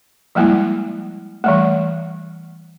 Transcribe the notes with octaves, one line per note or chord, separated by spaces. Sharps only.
F3 G3 G#3 A#3 E4
E3 G3 A3